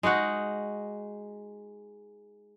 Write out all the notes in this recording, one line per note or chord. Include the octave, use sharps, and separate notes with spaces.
G#3 D#4 F#4 F#5